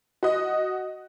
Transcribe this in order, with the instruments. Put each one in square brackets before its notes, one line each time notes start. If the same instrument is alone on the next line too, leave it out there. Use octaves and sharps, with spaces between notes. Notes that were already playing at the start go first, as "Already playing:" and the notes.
[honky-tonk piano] F#4 D#5